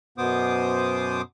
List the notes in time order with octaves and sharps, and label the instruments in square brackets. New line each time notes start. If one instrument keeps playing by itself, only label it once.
[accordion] F#2 B2 B3 C5 D6 D#6